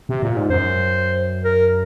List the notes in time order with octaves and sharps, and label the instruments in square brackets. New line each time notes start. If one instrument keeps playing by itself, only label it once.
[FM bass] C3
A#2
G#2
[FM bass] F#2 [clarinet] C5
[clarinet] A#4